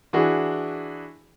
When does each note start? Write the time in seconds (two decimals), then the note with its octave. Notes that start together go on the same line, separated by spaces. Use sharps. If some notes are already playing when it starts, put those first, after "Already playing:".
0.13 E3 D4 F#4 G#4